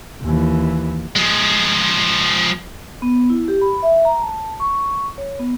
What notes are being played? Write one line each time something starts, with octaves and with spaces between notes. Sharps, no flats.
D#2 E3
F3 G#3
B3
E4
G4
B5
E5
A#5
A5
C#6
C#5
B3